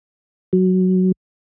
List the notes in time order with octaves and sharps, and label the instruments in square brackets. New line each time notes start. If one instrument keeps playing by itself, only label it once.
[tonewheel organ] F#3